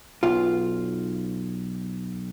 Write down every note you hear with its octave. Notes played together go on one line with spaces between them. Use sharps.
B1 F4